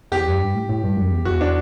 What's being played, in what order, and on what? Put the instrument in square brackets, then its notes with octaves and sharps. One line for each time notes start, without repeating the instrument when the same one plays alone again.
[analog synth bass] E2 [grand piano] G4
[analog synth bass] F#2
G2
A2
A2
G2
F#2
E2
[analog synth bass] E2 [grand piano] F#4
[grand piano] D4